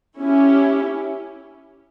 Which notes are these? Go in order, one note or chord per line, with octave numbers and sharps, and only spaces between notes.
C#4 E4 G4